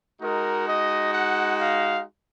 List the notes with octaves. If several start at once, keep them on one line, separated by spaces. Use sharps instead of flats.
G#3 D#4 F#4 A#4
D#5
F#5
F5